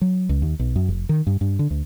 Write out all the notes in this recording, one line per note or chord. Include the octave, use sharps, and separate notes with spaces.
F#3
C#2
D#2
B1
F#2
F1
D#3
G2
G2
D3
D2